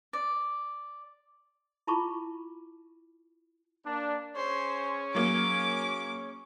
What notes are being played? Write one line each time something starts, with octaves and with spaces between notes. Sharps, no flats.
D5
E4 F4 A5 B5 C#6 D6
A#3 D4
C#4 G#4 C5 C#5
F#3 A#3 D6